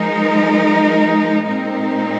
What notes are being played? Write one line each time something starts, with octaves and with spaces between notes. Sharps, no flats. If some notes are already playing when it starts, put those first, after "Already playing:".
Already playing: F3 G#3 D#4 A#4
A#2 G#3 C4 D#4 A#4